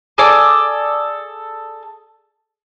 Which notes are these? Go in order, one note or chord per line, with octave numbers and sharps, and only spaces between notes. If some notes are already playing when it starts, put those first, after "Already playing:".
G#4 A4 D5 D6